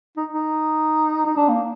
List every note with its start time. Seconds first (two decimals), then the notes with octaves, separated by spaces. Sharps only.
0.17 D#4
0.33 D#4
1.26 D#4
1.37 D4
1.48 A#3